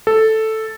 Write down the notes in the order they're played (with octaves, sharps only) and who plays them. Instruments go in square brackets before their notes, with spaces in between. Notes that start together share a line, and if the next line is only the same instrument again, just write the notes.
[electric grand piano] A4